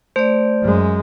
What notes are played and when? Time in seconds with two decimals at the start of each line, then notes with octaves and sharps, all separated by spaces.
0.16 A3 C5 D5
0.62 F#2 G#3